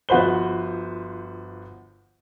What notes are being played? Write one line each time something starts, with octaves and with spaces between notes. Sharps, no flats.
G1 F3 F#4 B4 C5 G7